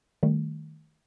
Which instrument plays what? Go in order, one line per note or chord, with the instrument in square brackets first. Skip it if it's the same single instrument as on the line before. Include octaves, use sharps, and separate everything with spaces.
[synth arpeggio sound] D#3 G3 A3